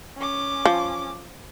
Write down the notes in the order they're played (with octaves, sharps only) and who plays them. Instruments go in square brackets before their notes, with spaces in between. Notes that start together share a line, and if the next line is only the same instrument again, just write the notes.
[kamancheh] C#4 D6
[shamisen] F3